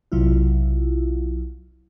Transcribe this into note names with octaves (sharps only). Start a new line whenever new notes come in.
B1 C3 F#3 E4 F4